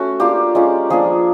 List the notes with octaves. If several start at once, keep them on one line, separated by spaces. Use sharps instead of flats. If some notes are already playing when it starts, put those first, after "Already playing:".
Already playing: A3 C#4 F#4
A#3 D4 F4 G4
G#3 C#4 F4
F3 A#3 D4 G#4